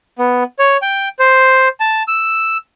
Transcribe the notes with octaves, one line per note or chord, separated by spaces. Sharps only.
B3
C#5
G5
C5
A5
E6